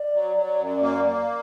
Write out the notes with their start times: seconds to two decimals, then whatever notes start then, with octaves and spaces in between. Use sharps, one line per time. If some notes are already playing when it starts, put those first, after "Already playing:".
Already playing: D5
0.14 F#3
0.36 F#3
0.59 F#2
0.82 A#3
1.05 A#3